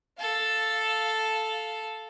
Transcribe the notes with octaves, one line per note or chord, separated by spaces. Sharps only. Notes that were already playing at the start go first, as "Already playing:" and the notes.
A4 F5